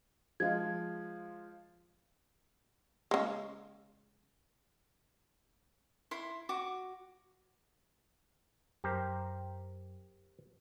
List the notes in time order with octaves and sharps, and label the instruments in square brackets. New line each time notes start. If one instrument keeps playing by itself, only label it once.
[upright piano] F3 G#3 F4 [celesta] G#6
[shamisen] C#3 G#3
[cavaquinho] E4 C6
F#4 D6
[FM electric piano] F#2 [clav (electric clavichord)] G4 A#4 C5